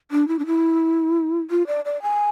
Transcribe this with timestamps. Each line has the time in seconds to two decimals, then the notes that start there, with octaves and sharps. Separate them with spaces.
0.11 D4
0.28 E4
0.39 D4
0.46 E4
1.50 F4
1.67 D5
1.85 D5
2.02 G#5